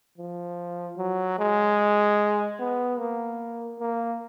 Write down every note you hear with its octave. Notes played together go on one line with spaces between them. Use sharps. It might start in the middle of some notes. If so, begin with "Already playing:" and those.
F3
F#3
G#3
B3
A#3
A#3